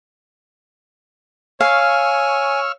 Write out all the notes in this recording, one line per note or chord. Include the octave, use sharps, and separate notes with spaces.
C#5 F5 G#5 C#6 E6 F6